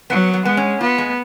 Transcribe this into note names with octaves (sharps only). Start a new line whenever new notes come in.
F#3 B3
B3
G#3 B3
C#4
B3 F4
G#3